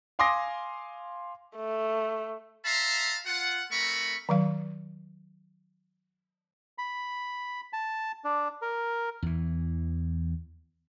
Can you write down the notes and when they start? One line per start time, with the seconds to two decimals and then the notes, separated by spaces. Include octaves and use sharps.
0.19 F5 G#5 C6 D6 D#6 A#6
1.56 A3
2.64 E5 F5 A5 A#5 C6
3.26 F4 F#5
3.71 A3 C4 A#4 B5 C#6
4.29 D#3 F#3 F5
6.78 B5
7.73 A5
8.24 D4
8.62 A#4
9.23 E2 E3